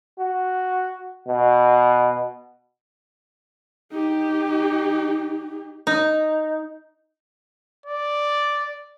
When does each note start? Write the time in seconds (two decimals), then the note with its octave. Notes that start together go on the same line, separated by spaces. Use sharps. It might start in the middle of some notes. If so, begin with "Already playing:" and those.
0.19 F#4
1.27 B2
3.91 D#4 G4
5.87 D#4
7.86 D5